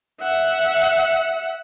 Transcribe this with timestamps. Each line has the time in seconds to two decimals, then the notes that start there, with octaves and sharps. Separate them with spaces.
0.21 E5 F#5